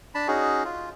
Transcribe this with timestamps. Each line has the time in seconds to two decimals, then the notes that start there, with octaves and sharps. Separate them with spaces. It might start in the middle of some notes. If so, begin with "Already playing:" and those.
0.15 D4 A5 B5
0.28 C#4 D#4 F#4 G#4
0.65 F4